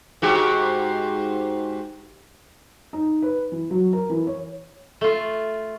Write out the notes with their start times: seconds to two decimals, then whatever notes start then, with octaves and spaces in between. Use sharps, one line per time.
0.22 G#2 F#4 G4
2.93 D#4
3.22 B4
3.52 E3
3.70 F#3
3.93 A#4
4.10 E3
4.27 C#5
5.01 A3 F4